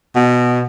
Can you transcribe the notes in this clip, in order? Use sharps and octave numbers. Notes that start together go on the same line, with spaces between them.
B2